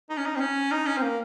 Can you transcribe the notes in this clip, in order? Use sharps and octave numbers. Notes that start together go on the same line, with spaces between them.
D#4
C#4
D#4
C4
C#4
D#4
C#4
C4
A#3